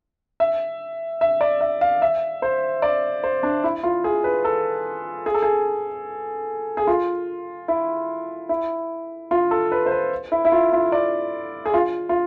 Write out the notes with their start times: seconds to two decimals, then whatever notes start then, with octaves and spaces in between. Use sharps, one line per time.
0.40 E5
1.21 E5
1.41 D5
1.61 E5
1.81 F5
2.02 E5
2.42 C5
2.82 D5
3.24 C5
3.43 D4
3.64 E4
3.83 F4
4.04 G#4
4.24 B4
4.45 A4
5.26 G#4
5.34 A4
5.42 G#4
6.77 G#4
6.87 F4
7.68 E4
8.49 E4
9.31 F4
9.51 A4
9.72 B4
9.86 C5
9.91 B4
10.32 E4
10.45 E4
10.52 F4
10.73 F4
10.92 D5
11.66 G#4
11.74 F4
12.09 F4